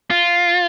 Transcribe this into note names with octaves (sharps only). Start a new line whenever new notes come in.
F4